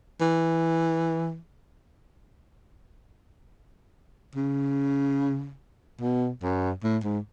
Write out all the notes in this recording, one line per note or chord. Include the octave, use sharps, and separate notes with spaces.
E3
C#3
B2
F#2
A2
G#2